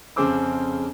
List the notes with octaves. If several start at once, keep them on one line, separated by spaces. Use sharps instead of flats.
F2 C#3 G#4 C5 D6 E6